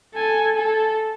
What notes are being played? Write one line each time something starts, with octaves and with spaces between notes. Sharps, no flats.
A4 G#5
A4